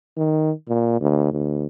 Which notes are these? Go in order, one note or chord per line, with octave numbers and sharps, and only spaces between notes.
D#3
A#2
D2
D2